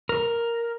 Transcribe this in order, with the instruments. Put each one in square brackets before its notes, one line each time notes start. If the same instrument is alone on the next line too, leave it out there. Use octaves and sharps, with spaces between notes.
[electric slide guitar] A#4